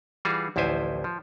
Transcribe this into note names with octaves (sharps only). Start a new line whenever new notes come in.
E3 G3 F4 F#4 G#4
A1 D2 F3 E4 C5 G#5
F3